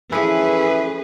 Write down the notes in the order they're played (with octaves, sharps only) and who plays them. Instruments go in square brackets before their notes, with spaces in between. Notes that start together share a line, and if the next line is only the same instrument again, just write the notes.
[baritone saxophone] E3 [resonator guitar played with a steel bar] F3 A3 [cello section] C#4 G#4 B4 [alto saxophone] E4